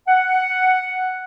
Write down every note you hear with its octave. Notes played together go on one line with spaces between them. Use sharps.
F#5